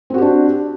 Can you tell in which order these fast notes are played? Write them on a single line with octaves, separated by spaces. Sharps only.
C4 F#4 G4 D4